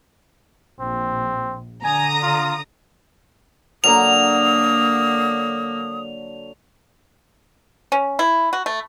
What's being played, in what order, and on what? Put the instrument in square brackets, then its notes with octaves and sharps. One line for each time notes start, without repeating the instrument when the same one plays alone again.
[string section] A#1 [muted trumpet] C4
[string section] D3 A#5 D#6 [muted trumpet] G#5
[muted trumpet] F4
[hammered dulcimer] D3 F#3 [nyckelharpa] A#3 [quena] D#6 [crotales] F7
[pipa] C#4
E4
F#4
A3